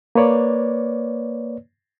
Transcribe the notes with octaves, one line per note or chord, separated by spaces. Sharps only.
A#3 B4 C#5 D5